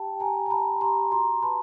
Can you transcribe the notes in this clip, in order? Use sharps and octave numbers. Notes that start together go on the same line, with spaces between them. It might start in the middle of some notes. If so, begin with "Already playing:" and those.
Already playing: G4 G5 A5
G4 G#5 A#5
A#5
G4 A5 B5
G4 A#5 C6
F#4 A#5 C6
B4 A5 B5